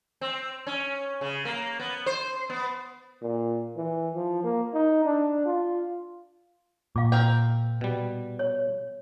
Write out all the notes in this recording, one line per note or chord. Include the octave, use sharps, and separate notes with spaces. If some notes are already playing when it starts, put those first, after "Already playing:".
C4
C#4
C#3
A#3
B3
C5
B3
A#2
E3
F3
A#3
D#4
D4
F4
A#2 F5 D6
C4 A#4 G5
B2 G3
C#5